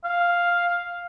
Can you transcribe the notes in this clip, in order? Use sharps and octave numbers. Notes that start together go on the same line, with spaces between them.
F5